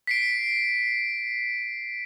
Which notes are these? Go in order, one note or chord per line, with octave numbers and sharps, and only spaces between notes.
B6 C7 D7